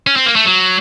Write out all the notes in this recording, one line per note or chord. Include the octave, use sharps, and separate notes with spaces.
C#4
C4
A#3
A3
F#3